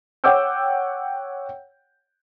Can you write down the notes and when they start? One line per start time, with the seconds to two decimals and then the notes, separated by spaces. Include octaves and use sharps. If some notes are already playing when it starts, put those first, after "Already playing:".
0.24 C#5 F#5 G5 D6 E6 G6